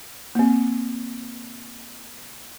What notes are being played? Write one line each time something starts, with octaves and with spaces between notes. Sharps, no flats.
A#3 C4